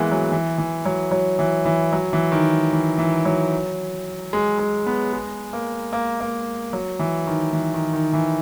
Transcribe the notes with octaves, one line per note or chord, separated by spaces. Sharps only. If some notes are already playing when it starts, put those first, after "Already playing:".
Already playing: E3 G#3 A#3 B3
F#3
E3
E3
F#3
F#3
E3
E3
F#3
E3
D#3
E3
E3
F#3
G#3
G#3
B3
G#3
A#3
A#3
A#3
F#3
E3
D#3
E3
D#3
D#3
E3